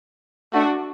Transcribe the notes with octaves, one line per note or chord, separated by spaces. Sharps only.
A3 D4 F#4